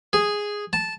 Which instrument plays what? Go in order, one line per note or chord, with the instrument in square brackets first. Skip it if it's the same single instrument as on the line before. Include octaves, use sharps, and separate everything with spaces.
[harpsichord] G#4
A5